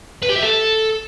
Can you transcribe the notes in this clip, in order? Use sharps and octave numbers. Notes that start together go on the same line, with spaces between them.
B4
G4
E5
A4